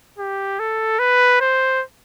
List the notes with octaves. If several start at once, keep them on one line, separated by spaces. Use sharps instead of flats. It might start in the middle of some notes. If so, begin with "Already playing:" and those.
G4
A4
B4
C5